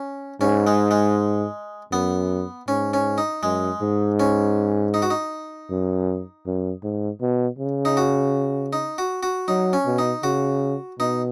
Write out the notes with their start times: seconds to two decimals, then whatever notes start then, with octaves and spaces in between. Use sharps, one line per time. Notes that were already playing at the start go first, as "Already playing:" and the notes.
Already playing: C#4
0.41 G#2 C#4
0.67 G#3
0.91 G#3
1.92 F#2 B3
2.68 G#2 C#4
2.94 C#4
3.18 D#4
3.43 F#2 G#3
3.82 G#2
4.20 C#4
4.94 D#4
5.02 F#4
5.10 D#4
5.70 F#2
6.46 F#2
6.83 G#2
7.21 B2
7.59 C#3
7.85 D#4
7.97 F#4
8.73 D#4
8.98 F#4
9.23 F#4
9.48 F#3 D#4
9.73 C#4
9.86 B2
9.99 D#4
10.23 C#3 F#4
10.99 B2 D#4